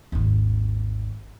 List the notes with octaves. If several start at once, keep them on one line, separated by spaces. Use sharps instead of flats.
G#1 D#2